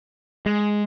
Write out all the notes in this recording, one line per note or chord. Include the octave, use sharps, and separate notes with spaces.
G#3